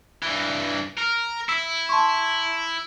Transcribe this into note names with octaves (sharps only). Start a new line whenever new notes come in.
G2 E3
A#4
E4 E6 B6
A5 C6 C#6